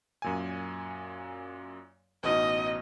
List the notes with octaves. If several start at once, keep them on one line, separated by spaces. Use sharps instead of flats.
F#2 A#2 G#5
A1 B2 D#4 D#5